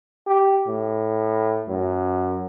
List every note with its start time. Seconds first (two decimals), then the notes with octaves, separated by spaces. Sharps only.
0.27 G4
0.67 A2
1.68 F#2